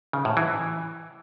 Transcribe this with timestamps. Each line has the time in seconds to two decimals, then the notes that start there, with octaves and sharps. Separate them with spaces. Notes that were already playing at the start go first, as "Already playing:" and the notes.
0.13 C#3
0.25 A2
0.37 E3